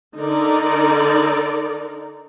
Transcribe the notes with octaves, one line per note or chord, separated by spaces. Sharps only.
D3 D#4 A#4 D5